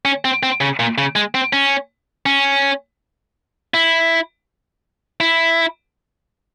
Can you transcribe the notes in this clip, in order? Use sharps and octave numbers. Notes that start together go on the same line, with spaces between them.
C#4
C4
C4
C#3
A#2
C#3
G#3
C4
C#4
C#4
E4
E4